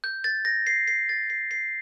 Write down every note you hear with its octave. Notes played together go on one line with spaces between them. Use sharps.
G6
A6
A#6
C7
C7
A6
C7
C7